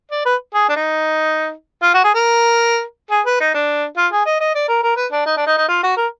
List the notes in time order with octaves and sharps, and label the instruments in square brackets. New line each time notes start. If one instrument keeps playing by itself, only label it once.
[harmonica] D5
B4
G#4
D4
D#4
F4
F#4
G#4
A#4
G#4
B4
D#4
D4
F4
G#4
D#5
D#5
D5
A#4
A#4
B4
D4
D#4
D4
D#4
D#4
F4
F#4
A#4